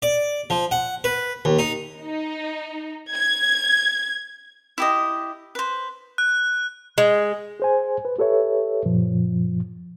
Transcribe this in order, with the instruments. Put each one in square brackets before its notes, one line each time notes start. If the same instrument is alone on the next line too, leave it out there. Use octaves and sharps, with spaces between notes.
[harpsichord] D5
F3
F#5
B4
D#2
D#4
[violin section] D#4
G#6
[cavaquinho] E4 G4 D#5
B4 C5
[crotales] F#6
[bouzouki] G#3
[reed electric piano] G#4 C5 G#5
B4
G4 A4 B4 C#5 E5
F#2 A#2 F3